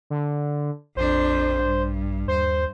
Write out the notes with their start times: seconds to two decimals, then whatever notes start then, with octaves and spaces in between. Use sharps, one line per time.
0.10 D3
0.97 A#1 F2 D4 C5
1.64 G2
2.28 D#2 C5